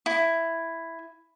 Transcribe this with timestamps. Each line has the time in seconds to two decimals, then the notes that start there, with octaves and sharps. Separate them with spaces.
0.06 E4